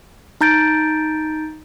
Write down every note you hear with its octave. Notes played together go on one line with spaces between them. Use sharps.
D#4 A#5 G6 A6 D7